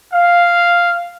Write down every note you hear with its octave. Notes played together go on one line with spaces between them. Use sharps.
F5